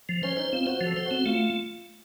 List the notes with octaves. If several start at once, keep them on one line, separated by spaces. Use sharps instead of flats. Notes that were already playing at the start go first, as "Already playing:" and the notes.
F3
C#4 C5
D#4 C5
C4 F4
F#4 C5
F3
A4
C5
F#4
C4
A3 F4